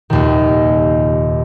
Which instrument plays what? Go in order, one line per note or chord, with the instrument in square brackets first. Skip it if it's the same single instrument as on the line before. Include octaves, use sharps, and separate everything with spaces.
[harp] F1 D#2 A#2 D#3